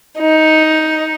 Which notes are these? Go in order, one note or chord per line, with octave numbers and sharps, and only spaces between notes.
D#4